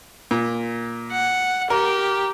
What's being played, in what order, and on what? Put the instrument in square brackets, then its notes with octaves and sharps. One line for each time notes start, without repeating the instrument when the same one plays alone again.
[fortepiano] A#2
[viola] F#5
[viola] G4 [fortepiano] A#4